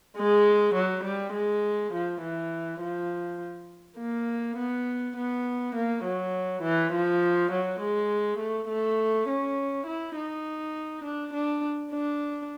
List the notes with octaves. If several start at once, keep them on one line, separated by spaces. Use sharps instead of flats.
G#3
F#3
G3
G#3
F3
E3
F3
A#3
B3
B3
A#3
F#3
E3
F3
F#3
G#3
A3
A3
C#4
E4
D#4
D4
D4
D4